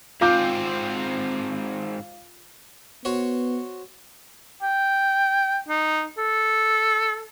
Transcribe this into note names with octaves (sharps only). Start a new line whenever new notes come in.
G#2 C4 F4 F5 D6 G6
B3 F#4 C5 C#5
G5
D#4
A4